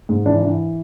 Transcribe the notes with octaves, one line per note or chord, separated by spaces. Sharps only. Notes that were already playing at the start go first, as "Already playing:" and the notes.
G#2
E3 D4
E3